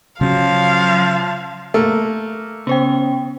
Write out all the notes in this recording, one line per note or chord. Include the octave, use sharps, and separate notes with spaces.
C#3 F3 F#3 C#4 F5
A3 A#3
C#3 B3 C5 G5